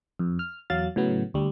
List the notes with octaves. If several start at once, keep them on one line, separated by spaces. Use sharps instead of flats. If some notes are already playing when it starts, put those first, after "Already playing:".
F2
F6
E2 F#3 F5 A6
A2 C#3 F#3 B3
D2 G3